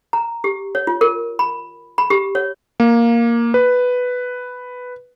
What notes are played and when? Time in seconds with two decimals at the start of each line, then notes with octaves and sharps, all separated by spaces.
0.13 A#5
0.44 G4
0.75 C#5
0.87 F4
1.01 A#4
1.39 B5
1.98 B5
2.10 G4
2.35 C#5
2.80 A#3
3.54 B4